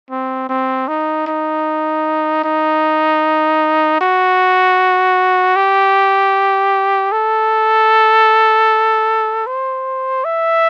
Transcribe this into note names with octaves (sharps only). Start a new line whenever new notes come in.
C4
C4
D#4
D#4
D#4
F#4
G4
A4
C5
E5